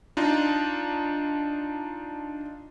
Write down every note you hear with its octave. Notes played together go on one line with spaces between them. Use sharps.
D4 D#4 F4